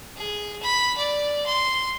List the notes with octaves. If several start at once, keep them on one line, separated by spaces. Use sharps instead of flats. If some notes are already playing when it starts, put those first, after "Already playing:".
G#4
B5
D5
C6